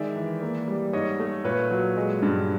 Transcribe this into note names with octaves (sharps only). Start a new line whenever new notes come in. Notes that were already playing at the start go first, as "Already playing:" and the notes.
Already playing: D#3 G#3 D5 E5
E3
A#3
G3
G#2 C#5 D#5
A3
A#2 B4 C#5
F#3
G#3
G2